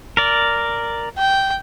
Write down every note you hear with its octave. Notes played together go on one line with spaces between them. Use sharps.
A#4 D5
G5